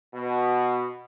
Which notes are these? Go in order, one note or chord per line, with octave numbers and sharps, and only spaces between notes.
B2